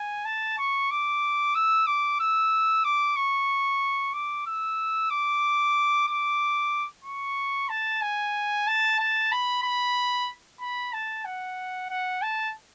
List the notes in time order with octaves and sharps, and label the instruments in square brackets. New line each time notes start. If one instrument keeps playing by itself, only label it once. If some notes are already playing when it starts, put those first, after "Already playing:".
Already playing: [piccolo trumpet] G#5
A5
C#6
D6
E6
D6
E6
D6
C#6
D6
E6
D6
D6
C#6
A5
G#5
A5
A5
B5
B5
B5
A5
F#5
F#5
A5